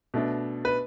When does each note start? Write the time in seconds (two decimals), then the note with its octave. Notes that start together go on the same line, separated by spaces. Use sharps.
0.14 B2 A3 D4
0.65 B4